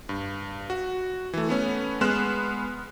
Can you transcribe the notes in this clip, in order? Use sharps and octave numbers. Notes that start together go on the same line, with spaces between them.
G2
F#4
E3 A3
A3 B3 C#4
G#3 B3 C6 F6 F#6 E7